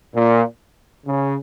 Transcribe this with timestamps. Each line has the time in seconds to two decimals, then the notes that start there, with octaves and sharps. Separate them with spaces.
0.14 A#2
1.06 C#3